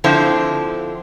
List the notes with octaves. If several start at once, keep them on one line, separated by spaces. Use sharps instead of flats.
D3 F3 C4 E4 C5